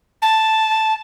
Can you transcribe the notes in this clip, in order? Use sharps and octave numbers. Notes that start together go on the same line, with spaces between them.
A5